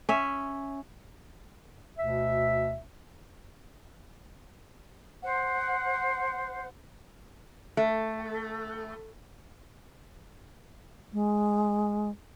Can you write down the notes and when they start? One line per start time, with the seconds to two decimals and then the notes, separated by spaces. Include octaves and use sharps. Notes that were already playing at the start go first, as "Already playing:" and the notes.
0.09 C#4 E5
1.96 D2 B2 E5
5.22 C5 F#5
7.77 A3
11.13 G#3